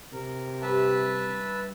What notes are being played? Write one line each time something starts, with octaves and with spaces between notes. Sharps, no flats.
C3 A#4
G2 B4 E5 A5